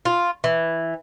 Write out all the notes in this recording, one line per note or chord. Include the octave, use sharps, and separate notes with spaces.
F4
E3